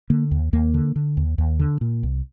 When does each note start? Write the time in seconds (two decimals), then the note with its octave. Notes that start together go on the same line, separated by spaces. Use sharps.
0.10 D3 A#3
0.31 D#2
0.53 D#2 A#3
0.74 D3
0.96 D3
1.17 D#2
1.38 D#2
1.59 D3
1.81 A#2
2.03 C2